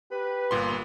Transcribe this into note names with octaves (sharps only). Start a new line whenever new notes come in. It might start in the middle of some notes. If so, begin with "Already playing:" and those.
G4 B4
G1 A#2 C6